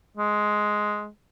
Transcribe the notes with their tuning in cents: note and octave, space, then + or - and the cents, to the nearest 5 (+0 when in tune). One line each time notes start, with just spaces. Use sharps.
G#3 +10